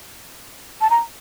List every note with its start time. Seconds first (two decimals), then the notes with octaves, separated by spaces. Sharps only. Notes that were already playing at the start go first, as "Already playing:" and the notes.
0.81 A5
0.90 A#5